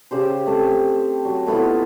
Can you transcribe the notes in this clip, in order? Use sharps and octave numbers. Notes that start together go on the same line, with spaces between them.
C#3 G4 C5
A3 C4
F#3
A3 B3 E4 F4